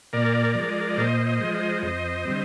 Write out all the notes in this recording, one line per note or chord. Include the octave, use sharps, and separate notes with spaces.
A#2 A#4 D5
F3 G#3
A#2 C5 D#5
C5 D#5
F3 G#3
C5 D#5
F2 C5 D#5
D3 G3 C4